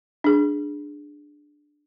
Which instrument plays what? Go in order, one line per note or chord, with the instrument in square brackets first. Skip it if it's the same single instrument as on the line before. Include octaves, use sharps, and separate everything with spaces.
[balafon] D4 G#4